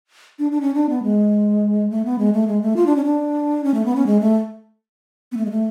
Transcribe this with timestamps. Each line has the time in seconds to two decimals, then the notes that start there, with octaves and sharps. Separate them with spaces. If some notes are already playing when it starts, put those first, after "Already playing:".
0.39 D4
0.52 D4
0.61 C#4
0.74 D4
0.89 B3
1.03 G#3
1.90 A3
2.05 B3
2.19 G#3
2.33 A3
2.48 G#3
2.62 A3
2.76 F4
2.86 D4
2.96 C#4
3.05 D4
3.64 C#4
3.74 A3
3.85 B3
3.96 C#4
4.07 G#3
4.21 A3
5.32 B3
5.37 A3
5.45 G#3
5.51 A3